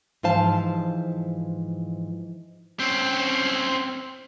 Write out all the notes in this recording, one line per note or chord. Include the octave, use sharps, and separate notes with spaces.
G#2 E3 F3 C5 F5 A5
C4 C#4